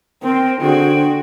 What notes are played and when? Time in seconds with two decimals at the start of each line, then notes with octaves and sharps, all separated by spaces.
0.23 C4 A#4 C5 G5
0.62 D3 F#4 G#4 C5 G5